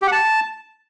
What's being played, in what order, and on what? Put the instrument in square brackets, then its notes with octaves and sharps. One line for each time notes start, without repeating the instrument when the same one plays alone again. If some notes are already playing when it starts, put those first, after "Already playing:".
[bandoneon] G4
F#5
A5